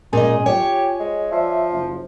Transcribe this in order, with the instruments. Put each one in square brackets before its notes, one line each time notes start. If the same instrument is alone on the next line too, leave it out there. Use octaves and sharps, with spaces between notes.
[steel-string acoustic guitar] A#2 D#5 [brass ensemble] G#3 C#4 [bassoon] G#4
[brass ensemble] F4 G#5 [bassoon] G4 [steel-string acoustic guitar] C#5
[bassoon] G#3
[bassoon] F3 [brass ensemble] D5 E5
[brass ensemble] F#1